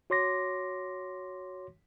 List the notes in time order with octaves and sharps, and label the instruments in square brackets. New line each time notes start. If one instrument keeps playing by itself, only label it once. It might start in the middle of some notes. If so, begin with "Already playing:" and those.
[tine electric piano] F#4 C#5 C6 D6 A#6